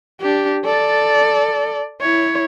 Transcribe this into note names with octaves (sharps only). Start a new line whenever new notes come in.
D4 G4
A4 D5
E4 C#5